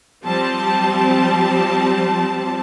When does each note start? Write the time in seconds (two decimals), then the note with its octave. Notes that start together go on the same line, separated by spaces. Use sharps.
0.25 F3 G3 C4 A5